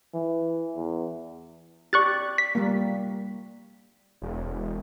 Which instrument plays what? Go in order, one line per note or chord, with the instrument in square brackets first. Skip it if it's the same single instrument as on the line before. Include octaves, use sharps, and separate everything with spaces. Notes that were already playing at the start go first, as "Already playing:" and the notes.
[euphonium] E3
E2
[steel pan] G4 D5 [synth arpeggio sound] C#6 F#6 A6
[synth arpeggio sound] B6
[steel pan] G3 A#3
[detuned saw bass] E1